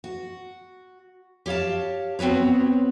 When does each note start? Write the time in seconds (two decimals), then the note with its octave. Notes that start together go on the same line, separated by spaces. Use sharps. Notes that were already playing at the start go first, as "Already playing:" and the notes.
0.04 F#4
1.46 G4 C#5 E5 F5 A5
2.19 B3 C4 F#4 B4 C#5